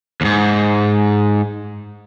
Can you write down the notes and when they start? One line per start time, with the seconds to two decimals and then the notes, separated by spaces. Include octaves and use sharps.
0.21 D#2 G#2